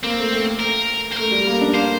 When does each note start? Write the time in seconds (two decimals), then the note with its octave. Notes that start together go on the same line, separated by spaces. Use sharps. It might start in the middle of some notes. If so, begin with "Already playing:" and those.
0.03 A#3 C4
0.18 A3
0.32 A3
0.60 A#4
1.12 C5
1.17 A3 A#4
1.31 G3
1.47 A#3
1.61 D4
1.74 A#3 C5